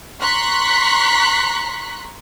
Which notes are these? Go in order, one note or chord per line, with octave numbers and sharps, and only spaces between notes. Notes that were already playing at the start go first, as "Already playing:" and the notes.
A#5 C6 C#6 F#6 B6